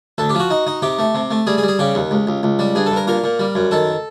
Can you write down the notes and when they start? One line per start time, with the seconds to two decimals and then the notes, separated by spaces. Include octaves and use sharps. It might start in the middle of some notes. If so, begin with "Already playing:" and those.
0.18 D2 A4
0.29 G4
0.35 F3 F#4
0.50 D#4
0.67 D#4
0.82 C3 G4
0.99 A3
1.15 C3
1.31 A3
1.47 G3 G#4
1.58 G#4
1.63 G3
1.68 G#4
1.79 C#3 G4
1.95 D#2
2.11 C#2
2.27 C#2
2.43 C#2
2.59 G3
2.75 G2 G#4
2.86 A4
2.91 G2
2.96 A#4
3.07 A#2 A#4
3.24 A#2
3.39 G3
3.55 F#2
3.71 D#3 A4